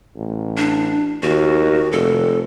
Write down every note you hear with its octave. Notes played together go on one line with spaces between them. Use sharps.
A1
D4
D#2 F#4
F1 A4